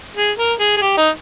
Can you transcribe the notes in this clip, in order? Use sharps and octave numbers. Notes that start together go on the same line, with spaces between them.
G#4
A#4
G#4
G#4
G4
D#4